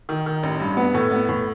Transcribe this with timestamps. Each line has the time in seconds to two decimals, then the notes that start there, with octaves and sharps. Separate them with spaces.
0.09 D#3
0.26 D#3
0.43 A1
0.60 G2
0.77 B3
0.94 A2
1.11 B3
1.29 A2